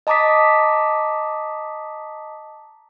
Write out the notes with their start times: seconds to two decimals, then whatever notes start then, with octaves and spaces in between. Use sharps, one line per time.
0.07 D#5 A5 A#5 D6 D#6 B6